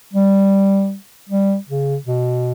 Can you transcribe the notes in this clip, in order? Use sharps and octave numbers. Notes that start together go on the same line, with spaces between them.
G3
G3
C#3
B2